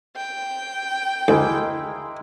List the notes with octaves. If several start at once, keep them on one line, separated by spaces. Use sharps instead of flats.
G5
D2 G#3 A#3 E4